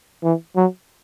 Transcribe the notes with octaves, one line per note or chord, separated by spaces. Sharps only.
E3
F#3